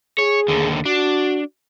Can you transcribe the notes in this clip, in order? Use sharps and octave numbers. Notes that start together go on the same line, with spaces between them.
G#4 C#5
D#2 D3
D4 F#4